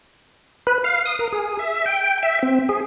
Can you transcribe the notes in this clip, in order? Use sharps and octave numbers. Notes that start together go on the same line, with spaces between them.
B4
F5
D#6
A#4
G#4
E5
G5
E5
C4
G#4